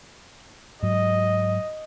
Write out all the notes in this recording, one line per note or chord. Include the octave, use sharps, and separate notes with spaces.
G#2 F#3 D#5